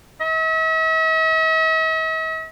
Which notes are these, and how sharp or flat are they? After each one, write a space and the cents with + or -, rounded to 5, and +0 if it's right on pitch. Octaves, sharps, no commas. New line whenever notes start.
E5 -45